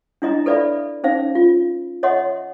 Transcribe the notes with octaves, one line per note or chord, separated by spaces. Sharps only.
D4 E4 D#5 A#5
A4 B4 D5 E5 F5 B5
C#4 D#4 C5 F5
F4
C#5 D#5 E5 F#5 C6